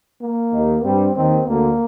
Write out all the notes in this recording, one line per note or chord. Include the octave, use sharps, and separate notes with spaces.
A#3
D#2 D#3
G2 G3 C4
D#2 D#3 C4
D2 D3 A#3